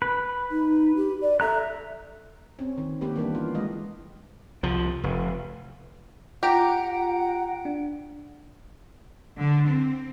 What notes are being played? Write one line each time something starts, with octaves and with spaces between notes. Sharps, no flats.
B4
D#4
G4
D5
A4 E5 A#5 F#6
C4 C#4
D#3
A#3 B3 G4 B4
E3 G3 A#3 D4
F4
E3 G#3 F4 D#5
C2 F3
F1
F4 G4 F#5 G5 A#5 D7
D4
D3
C4